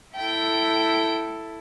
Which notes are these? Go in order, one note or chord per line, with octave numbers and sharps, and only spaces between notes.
E4 A4 G5